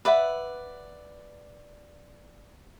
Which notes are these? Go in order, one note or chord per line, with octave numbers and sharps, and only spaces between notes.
B4 D5 E5 F#5